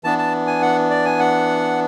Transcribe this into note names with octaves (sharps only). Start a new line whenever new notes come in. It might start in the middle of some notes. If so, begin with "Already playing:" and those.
E3 B3 D4 A5
A5
G#5
F#5
D5
G#5
F#5